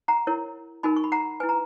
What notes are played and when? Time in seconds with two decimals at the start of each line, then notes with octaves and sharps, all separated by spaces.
0.08 F#5 A#5
0.27 E4 A#4 C#5
0.83 D#4 F#4 A#4 G#5 B5
0.96 C#6
1.04 B5
1.12 F#5 A#5
1.40 E4 B4 G#5
1.49 A#5